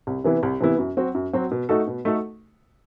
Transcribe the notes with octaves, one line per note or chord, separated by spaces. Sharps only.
C2
C3 E3 B3 E4
C2
C3 E3 B3 E4
F#2
F#3 C4 F#4
F#2
F#3 C4 F#4
B2
A3 D#4 F#4 A4
B2
A3 D#4 F#4 A4